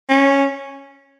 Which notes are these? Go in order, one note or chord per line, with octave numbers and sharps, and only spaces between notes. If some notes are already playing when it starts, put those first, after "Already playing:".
C#4